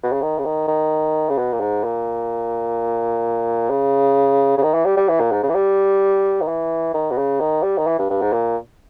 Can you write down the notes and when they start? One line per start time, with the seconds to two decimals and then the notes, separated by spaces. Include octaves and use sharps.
0.03 B2
0.12 C#3
0.22 D#3
0.38 C#3
0.45 D#3
0.68 D#3
1.29 C#3
1.38 B2
1.53 A#2
1.60 G#2
1.84 A#2
3.70 C#3
4.57 C#3
4.63 D#3
4.74 E3
4.85 G3
4.97 G3
5.09 E3
5.20 A#2
5.32 G#2
5.43 C#3
5.49 E3
5.55 G3
6.42 D#3
6.48 E3
6.94 D#3
7.10 B2
7.18 C#3
7.40 D#3
7.63 G3
7.78 D#3
7.87 E3
7.99 G2
8.10 G2
8.22 G#2
8.33 A#2